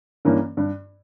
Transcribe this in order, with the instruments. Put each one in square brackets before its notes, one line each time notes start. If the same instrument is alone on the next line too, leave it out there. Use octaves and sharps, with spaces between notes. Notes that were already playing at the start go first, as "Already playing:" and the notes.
[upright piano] G2 E3 A#3 C#4
G2